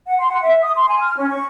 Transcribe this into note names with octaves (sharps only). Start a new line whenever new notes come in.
F#5
C6
F#5
E5
D#6
C6
G#5
F6
C#4
C#6